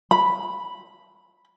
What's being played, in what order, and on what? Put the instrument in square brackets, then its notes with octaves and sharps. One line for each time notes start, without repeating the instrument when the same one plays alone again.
[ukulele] B5